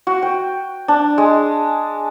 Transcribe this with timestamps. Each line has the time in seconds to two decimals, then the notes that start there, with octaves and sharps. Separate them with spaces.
0.07 F#4
0.22 G5
0.88 D4
1.18 G#3